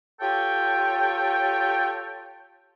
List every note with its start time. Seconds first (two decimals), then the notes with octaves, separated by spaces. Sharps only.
0.21 F4 G4 A4 C#5 G5